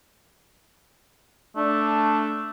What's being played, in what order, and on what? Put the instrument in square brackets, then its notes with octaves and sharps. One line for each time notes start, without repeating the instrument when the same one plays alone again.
[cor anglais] A3 [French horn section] D4